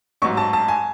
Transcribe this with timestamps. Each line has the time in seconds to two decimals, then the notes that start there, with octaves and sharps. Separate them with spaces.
0.22 A1 G#2 F#3 C#6
0.37 A5
0.53 A5
0.68 G#5